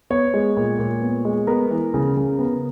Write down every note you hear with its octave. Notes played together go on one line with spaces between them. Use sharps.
B3 C#5
G#3
A#2
A#2
B3
G#3
B3 A#4
E3
C#3
C#3
B3